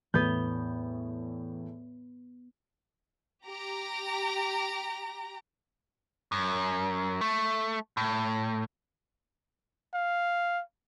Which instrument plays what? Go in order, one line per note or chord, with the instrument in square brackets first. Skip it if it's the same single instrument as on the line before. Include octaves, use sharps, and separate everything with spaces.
[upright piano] E2 A2 [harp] B3 G6
[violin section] G4 A#5
[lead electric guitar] F#2
A3
A2
[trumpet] F5